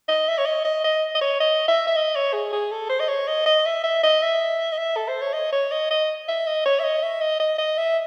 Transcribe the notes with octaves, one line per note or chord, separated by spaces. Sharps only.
D#5
E5
C#5
D#5
D#5
D#5
D#5
C#5
D#5
E5
E5
D#5
C#5
G#4
G#4
A4
C5
D#5
C#5
D#5
D#5
E5
E5
D#5
E5
D#5
E5
A4
C5
C#5
D#5
C#5
D#5
D#5
E5
D#5
C#5
E5
D#5
E5
D#5
D#5
D#5
E5